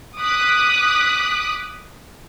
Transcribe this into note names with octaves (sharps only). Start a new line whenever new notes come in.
D6 D#6 F#6 B6